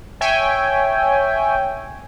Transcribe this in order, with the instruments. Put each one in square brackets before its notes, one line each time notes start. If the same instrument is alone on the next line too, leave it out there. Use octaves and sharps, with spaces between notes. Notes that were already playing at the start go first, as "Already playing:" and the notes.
[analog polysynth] C#5 E5 G5 G#5